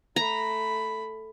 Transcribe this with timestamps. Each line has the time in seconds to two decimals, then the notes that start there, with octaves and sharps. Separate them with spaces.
0.16 A3 A#5 B5